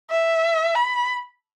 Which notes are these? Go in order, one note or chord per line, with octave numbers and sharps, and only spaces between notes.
E5
B5